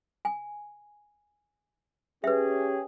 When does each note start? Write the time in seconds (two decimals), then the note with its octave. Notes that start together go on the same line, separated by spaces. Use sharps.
0.25 G#5
2.24 C#4 G4 G#4 B4 E5